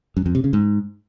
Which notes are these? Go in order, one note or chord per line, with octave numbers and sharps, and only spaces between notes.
F#2
F2
C3
C#3
G#2